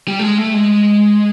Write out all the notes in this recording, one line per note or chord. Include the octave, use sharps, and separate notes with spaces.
G3
A3
G#3
A3
G#3